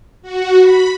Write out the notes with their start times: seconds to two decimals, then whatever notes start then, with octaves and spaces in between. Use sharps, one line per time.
0.22 F#4
0.60 B5